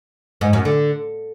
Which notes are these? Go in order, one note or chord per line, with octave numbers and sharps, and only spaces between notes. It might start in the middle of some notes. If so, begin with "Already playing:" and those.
G#2
F#2
D3